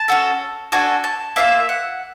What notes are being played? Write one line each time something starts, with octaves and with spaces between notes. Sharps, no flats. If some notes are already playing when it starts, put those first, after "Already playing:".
Already playing: A5
C#4 F#4 A4
D4 F#4 A4 G#5
A5
A#3 D4 F4 E5
F#5